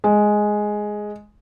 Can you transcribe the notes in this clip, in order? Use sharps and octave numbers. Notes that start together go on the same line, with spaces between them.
G#3